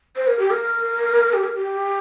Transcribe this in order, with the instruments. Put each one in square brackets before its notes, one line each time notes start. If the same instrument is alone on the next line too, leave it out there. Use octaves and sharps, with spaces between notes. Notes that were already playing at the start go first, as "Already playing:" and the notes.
[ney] C5
A#4
G4
A#4
G4
A#4
G4